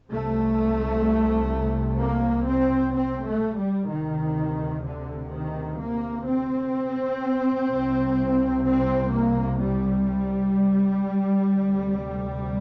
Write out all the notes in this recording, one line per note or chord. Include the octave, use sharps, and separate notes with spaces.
C2 C3 A3
A#3
C4
C4
A3
G3
D2 C3 D#3
D3
D#3
A#3
C4
C2 C3
C4
A#3
G3
D2 C3